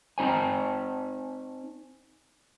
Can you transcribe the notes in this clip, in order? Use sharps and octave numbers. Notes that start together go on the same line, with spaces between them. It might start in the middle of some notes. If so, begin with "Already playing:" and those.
C4 D#4 C5 G#5